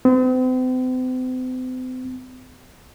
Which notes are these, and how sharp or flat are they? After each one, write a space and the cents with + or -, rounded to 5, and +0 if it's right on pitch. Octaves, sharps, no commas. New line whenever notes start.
C4 -45